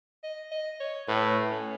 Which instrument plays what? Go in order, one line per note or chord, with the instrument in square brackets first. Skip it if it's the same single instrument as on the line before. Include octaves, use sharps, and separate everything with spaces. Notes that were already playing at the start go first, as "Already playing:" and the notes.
[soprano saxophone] D#5
D#5
C#5
[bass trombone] A2 [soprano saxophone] B4
[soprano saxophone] C#4